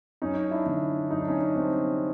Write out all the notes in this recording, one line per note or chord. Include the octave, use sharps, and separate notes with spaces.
F#2 C#4 D#4
D4 E4
D3
F#2 D#4
D4
C#4 D#4
G3 C4 D4